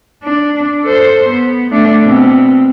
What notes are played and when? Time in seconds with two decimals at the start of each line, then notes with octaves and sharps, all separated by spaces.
0.24 D4
0.85 A4 C5
1.29 B3
1.71 A3 D4
2.03 B2 C4